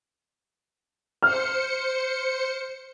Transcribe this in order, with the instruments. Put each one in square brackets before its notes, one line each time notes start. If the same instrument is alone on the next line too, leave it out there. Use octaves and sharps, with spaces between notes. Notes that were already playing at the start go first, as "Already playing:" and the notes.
[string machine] C5 C#7 [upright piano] F6